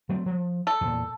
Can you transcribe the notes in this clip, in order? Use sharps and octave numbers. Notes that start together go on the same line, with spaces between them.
F#3 A3 C4
F3
A4
E2 A#2